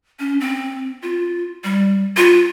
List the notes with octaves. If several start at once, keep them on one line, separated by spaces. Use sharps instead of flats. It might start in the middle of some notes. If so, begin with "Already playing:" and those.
C#4
C4
F4
G3
F4